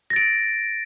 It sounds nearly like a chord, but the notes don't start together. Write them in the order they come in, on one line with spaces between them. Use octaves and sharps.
A#6 A6 D7